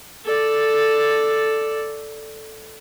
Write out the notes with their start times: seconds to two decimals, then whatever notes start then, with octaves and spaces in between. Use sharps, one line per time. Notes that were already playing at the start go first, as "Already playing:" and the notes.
0.25 A4 D5